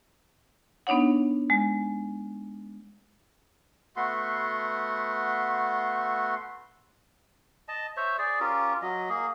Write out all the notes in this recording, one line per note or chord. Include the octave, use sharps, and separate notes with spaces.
B3 D4 D#4 C#5 F#5
G#3
A3 B3 F#4 C6
D#5 A5
C5 C#5 E5
G#4 D5
C#4 F4 G4 A#4
F#3 D#5
A#3 G#4